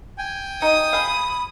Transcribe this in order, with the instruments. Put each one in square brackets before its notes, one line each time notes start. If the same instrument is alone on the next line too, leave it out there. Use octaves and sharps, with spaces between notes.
[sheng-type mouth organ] G5 G#5
[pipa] D#4 [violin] D#6
[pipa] G#4 F5 [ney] B5